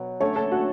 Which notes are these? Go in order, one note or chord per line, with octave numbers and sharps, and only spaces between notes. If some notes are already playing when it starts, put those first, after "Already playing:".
Already playing: B2 F#3
D3 A3 C#4 C#5
A4
F#4